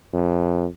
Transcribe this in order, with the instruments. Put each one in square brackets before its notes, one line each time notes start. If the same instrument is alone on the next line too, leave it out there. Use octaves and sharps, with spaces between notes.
[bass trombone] F2